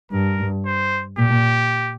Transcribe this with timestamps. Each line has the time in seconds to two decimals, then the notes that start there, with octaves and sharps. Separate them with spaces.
0.12 G2 A#4
0.65 C5
1.17 A#2 G4